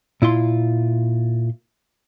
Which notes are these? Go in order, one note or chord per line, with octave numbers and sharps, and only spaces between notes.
A#2 E4 F4 C6